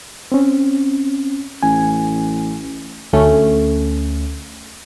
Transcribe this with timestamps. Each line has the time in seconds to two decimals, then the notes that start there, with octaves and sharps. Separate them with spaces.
0.32 C4 C#4
1.63 A1 G#5
3.13 D2 A3 C#4